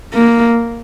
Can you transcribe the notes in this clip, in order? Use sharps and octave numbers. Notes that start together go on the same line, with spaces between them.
A#3